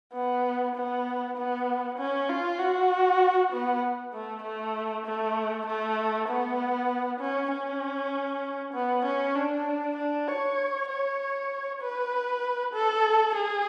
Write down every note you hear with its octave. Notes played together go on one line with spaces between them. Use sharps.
B3
B3
B3
C#4
F4
F#4
B3
A3
A3
A3
A3
B3
C#4
C#4
B3
C#4
D4
D4
C#5
C#5
B4
A4
G#4